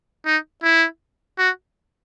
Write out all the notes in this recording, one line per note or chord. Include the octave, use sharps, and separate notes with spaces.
D#4
E4
F#4